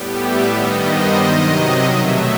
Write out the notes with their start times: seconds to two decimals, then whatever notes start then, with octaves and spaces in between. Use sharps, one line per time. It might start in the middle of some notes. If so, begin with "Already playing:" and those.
Already playing: A2 G3 B3 G4
0.18 E5
0.53 G2 D#3 G3 B3 D#5
0.87 C5
1.21 C3 D#3 F#3 D#5
1.90 B2 F#3 A3 E5